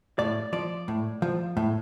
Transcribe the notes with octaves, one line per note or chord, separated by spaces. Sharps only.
A2 D5
F3 D5
A2
F3
A2